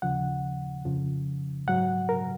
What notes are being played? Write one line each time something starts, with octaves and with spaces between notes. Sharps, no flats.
D#2 C#3 F3 F#5
F2 C#3 F3
G#2 F#3 F#5
A#4